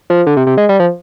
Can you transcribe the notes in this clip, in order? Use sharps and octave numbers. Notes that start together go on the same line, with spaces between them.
F3
D3
C3
C3
G#3
G3
F3